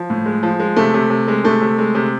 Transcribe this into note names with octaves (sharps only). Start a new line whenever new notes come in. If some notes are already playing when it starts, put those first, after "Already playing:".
Already playing: F3
A2
G#3
F3
G#3
C3 A3
C3
C3
G#3
C3 A3
C3
G#3
C3